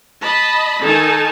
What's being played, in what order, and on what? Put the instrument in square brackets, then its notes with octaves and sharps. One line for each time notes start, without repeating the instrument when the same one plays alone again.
[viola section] D#5 A5 B5
D#3 D#4 A4 G#5 A5